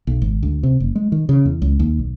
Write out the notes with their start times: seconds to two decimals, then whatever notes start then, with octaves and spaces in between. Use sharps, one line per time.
0.07 B1
0.22 G#1
0.43 D2
0.63 C3
0.80 F#1
0.95 G#3
1.12 D#3
1.29 C#3
1.45 E2
1.62 C#2
1.79 D#2
1.99 B1